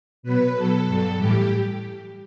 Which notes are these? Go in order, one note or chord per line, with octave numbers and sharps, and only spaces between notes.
B2 F#3 B4
B2 F#3 A4
G2 F#3
A2 E3 G3 G4